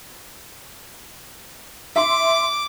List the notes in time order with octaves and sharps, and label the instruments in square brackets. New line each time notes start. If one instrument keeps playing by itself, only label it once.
[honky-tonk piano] E5 C6 [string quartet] D6